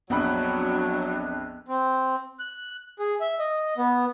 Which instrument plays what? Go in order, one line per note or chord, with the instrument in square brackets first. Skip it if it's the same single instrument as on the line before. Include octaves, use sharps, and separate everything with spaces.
[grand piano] A#1 F2 B5 [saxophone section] F#3 [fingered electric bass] B3 [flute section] D4 F#6
[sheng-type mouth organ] C4
F#6
G#4
E5
D#5
B3